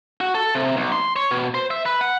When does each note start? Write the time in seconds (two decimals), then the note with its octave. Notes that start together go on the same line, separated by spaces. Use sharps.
0.21 F#4
0.35 A4
0.55 C3
0.77 B1
0.92 C6
1.16 C#5
1.31 B2
1.54 C5
1.71 E5
1.86 B4
2.01 F#5